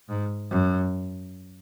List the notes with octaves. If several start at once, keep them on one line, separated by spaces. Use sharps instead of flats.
G#2
F#2